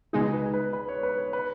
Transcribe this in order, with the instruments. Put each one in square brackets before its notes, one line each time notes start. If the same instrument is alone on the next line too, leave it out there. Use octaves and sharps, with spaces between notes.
[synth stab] C#2 B2 G#3 D#4 [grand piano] G#4
[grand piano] B4
B4
B4
C#5
B4
C#5
B4